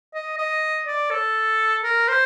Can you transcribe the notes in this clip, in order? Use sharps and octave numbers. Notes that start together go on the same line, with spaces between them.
D#5
D#5
D5
A4
A#4
C5